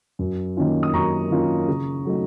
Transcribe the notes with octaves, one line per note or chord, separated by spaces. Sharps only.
F#2
D#3 A#3 C#4 F4
D#6
F#2 A#5 C#6
D#3 A#3 C#4 F4
C#3
F#3 A3 D#4